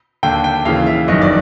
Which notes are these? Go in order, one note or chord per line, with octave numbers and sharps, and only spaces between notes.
D#2 D3 G5
G5
D#2 C#3 E3 F5
E5
G1 F#2 D#3 D#5
D5